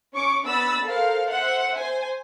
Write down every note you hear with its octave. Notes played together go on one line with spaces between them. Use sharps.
C#4 C#6 D6
B3 D4 B5 E6 A6
A4 A#4 C5 F5
C5 E5 F#5
C5 G#5